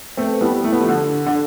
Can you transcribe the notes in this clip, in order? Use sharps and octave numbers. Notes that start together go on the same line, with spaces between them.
A3 C4 B4
G3 B3 E4
A3 G4
B3
F3 A3
D3 D4
D4
D3